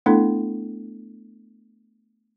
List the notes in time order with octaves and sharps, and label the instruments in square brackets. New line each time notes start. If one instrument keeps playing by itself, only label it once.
[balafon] A3 B3 D4 E4 A4